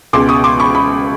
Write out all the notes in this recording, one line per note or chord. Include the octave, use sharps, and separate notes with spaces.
C#2 B2 G#3 C6 D6
C#6 D#6
C6 D6
B5 C#6
B5 C#6